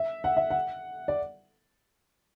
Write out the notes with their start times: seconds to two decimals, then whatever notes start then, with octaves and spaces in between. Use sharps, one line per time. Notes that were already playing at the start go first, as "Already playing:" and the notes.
Already playing: E5
0.24 F#5
0.37 E5
0.50 F#5
1.08 D5